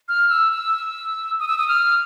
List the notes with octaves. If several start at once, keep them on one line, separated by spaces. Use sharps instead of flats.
F6
E6
E6
D#6
E6
D#6
F6